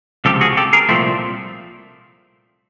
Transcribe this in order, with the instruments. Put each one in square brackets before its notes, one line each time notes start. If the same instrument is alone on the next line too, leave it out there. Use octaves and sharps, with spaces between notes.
[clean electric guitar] C#2 C3 F3 G4 A4
F#4 G#4
G4 A4
G#4 A#4
C2 A#2 F3 A3 C4